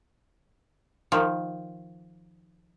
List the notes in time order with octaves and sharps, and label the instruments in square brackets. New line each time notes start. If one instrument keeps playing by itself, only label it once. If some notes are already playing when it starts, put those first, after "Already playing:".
[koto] D#3 F3